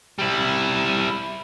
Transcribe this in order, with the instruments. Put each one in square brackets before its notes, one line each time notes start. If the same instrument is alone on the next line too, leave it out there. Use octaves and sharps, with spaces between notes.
[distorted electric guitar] G3 E4